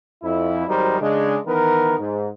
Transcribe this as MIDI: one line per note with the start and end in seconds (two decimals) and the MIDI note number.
0.23 0.65 41
0.23 0.65 64
0.67 0.97 32
0.67 0.97 54
0.67 0.97 55
0.67 0.97 63
0.67 0.97 70
0.67 0.97 72
1.00 1.36 49
1.00 1.36 56
1.00 1.36 62
1.46 1.97 51
1.46 1.97 52
1.46 1.97 59
1.46 1.97 70
1.98 2.28 44